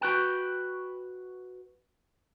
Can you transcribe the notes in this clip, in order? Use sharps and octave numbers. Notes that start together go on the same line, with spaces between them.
F#4 B4 G5